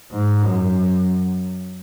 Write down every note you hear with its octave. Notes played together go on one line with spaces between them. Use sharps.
G#2
F#2